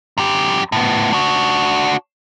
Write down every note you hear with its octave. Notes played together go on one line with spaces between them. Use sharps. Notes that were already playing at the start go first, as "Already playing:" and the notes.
F#2 G4
A2 B3
D4 F#4